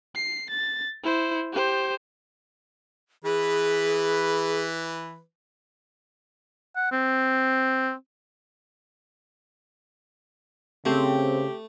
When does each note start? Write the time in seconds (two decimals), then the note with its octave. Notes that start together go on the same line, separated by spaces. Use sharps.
0.15 C7
0.50 A6
1.03 E4 C5
1.53 G4 C5
3.24 E3 G#4 B4
6.76 F#5
6.92 C4
10.86 C#3 A3 C4 G4